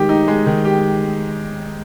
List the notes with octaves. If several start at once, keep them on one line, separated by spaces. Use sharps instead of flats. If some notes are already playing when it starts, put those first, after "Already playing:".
Already playing: D#3 G#3 G4
D#4
G#3
D#3
G4